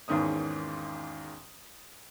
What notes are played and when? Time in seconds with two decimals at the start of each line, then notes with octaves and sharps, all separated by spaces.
0.08 G#1 E2 G#2 D#3 C#4 D#6